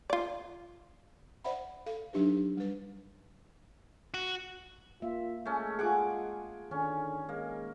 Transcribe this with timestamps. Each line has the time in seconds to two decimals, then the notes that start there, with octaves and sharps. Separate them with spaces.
0.10 F4 D5
1.44 C5 D5 E5 F#5 B5
1.86 A4 F5
2.13 F#3 D4 D#4 G4 B4
2.57 G3 B4
4.14 F#4
5.02 A#3 F4 E5
5.46 G#3 A3 C#4
5.79 F4 G#4 F#5 G#5 D6
6.71 D3 D#3 C#4
7.29 G#3 A#3